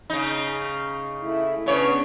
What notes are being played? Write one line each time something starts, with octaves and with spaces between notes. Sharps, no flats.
C#3 D#4
A3 E4
C#3 B3 C#4 D4 C#5